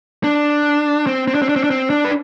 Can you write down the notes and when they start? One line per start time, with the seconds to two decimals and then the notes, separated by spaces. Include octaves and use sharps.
0.24 D4
1.07 C4
1.27 C4
1.35 D4
1.42 C4
1.49 D4
1.56 C4
1.64 D4
1.71 C4
1.90 D4
2.05 B4